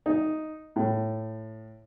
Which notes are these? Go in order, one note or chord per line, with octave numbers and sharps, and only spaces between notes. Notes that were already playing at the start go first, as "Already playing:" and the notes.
D#4
A2